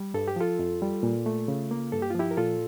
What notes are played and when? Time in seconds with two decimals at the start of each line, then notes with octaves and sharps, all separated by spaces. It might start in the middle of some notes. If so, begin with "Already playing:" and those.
Already playing: G3
0.14 G2 A4
0.28 G4
0.36 F3 F4 A4
0.59 F2
0.82 G3
1.03 A#2
1.26 A3
1.48 C#3
1.71 A#3
1.92 G2 A4
2.02 G4
2.10 F4
2.15 F3 E4 G4
2.31 A#4
2.37 A#2 F4 A4